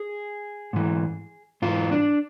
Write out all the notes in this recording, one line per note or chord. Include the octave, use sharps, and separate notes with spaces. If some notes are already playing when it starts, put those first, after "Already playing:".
Already playing: G#4
G#2 E3
G#2 E3 F4
D4